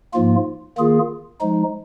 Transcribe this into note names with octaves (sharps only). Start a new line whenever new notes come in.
G#2 F3 A#3 F4
D#3 A#3 F4 G#4
F3 G#3 D#4